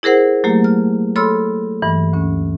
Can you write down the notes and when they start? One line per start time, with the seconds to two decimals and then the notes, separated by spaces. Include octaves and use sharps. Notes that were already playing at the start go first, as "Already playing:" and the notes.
0.03 E4 G#4 A#4 C5 F#5
0.44 F#3 A3 A#3 G4
0.64 F6
1.16 A4 C#5 B5 C6 E6 F6
1.82 G2 E3
2.13 D2 C#4